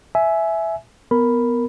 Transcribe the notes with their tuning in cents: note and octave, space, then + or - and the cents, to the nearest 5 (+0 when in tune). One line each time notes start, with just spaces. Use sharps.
E5 +0 G#5 +20
B3 +0 A#4 +0 B5 +0